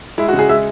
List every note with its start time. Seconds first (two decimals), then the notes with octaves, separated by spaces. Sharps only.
0.18 G#3 E4
0.28 F#4
0.33 C#3
0.39 G#4
0.48 G#3 E5